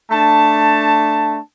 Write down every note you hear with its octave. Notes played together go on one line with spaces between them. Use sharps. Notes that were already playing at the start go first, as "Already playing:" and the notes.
A3 D4 A5